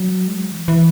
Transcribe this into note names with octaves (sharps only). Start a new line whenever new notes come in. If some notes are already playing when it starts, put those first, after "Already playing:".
Already playing: F#3
G#3
F#3
E3
E3